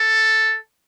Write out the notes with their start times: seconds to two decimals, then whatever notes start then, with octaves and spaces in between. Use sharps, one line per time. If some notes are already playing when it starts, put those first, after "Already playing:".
Already playing: A4